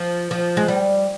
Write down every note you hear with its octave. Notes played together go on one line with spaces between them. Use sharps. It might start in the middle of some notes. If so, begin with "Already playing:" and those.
Already playing: F3
F3
G#3
G3